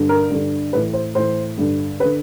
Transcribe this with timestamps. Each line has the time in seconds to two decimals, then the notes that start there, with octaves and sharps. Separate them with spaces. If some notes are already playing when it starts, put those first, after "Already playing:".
Already playing: G2 D3
0.09 A#4
0.30 G2 D3
0.73 A2 E3 B4
0.93 C5
1.15 A2 E3 C5
1.57 G2 D3
2.00 D3 B4